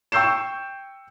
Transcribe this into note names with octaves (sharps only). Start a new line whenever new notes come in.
G5 C#6 E6 G6 C7 E7